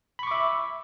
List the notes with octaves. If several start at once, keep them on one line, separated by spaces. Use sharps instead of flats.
E5 B5 C#6 D6